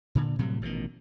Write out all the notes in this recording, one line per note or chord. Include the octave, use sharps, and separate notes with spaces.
A#2 D3
A2 C3 F#3 G3
A1 B2 D3 D#3